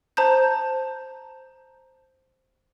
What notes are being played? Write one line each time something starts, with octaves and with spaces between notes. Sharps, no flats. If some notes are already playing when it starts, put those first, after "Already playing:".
C5 A5 A#5 G6